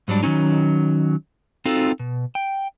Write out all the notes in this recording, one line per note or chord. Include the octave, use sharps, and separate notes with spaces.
G#2 F#3 G3 D4
D#3 F3 F#3 C#4 D#4
C4 D#4 F4 F#4 A4
B2
G5